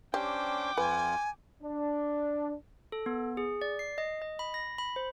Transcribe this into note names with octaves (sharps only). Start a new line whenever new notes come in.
C#4 D4 G4 C5 G5 D6
F2 F4 B4 G#5
D4
A4
B3
G#4
D5
C7
D#5
D#5
B5
A#6
B5
C5